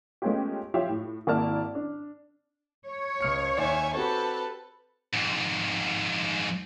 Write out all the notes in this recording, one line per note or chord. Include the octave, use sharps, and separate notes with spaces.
G#3 A3 B3 C#4 F4 G4
F3 F4 G4 C#5 E5 F5
A2
G#1 A#3 E4 D5 A5 F6
D4
C#5
C#2 F6 C#7
D#2 C5 D5 E5 G#5
C4 F#4 G4 A4 B4
F2 G#2